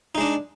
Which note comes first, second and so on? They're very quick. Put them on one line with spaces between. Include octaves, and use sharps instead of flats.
D#4 G#3 D4